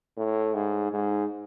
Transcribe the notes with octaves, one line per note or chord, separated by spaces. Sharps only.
A2
G#2
G#2